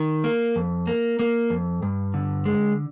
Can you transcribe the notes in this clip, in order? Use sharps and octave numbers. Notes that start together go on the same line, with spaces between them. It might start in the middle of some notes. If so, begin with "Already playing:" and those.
Already playing: D#3
A#3
F2
A#3
A#3
F2
G2
D3
G#3